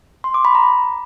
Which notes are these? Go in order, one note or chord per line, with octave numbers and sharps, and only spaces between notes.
C6
D6
B5
A#5